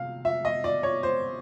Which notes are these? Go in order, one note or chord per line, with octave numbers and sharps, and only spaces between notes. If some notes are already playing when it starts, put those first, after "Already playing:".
Already playing: C3 F5
E5
D#5
D5
C#5
C5